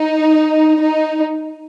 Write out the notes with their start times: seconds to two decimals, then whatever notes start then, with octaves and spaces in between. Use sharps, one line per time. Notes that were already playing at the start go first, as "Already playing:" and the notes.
Already playing: D#4
0.81 D#4